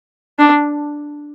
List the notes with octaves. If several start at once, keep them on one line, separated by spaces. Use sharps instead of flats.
D4